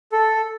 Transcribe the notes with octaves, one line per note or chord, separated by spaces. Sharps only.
A4